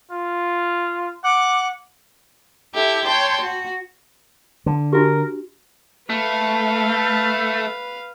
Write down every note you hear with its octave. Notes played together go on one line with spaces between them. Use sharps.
F4
F#5 D6
E4 G4 A4 E5
C#5 G5 A5 C6
F#4
D3
D4 F#4 G4 A#4
A3 B4 F5